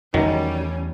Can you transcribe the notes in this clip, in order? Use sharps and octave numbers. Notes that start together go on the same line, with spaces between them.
E2 D#3 F#3 G3 A3 C#4